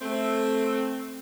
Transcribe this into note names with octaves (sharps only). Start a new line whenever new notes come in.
A3 C4